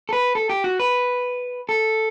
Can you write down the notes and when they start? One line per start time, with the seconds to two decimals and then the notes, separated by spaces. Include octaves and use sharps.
0.09 A4
0.13 B4
0.35 A4
0.49 G4
0.64 F#4
0.80 B4
1.69 A4